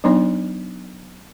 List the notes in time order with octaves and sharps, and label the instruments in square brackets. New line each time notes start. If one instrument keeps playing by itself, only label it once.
[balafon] F#3 B3 D4 D#4 C#5